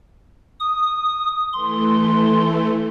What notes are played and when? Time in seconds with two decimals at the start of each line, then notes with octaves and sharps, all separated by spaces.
0.60 D#6
1.53 E3 A3 C6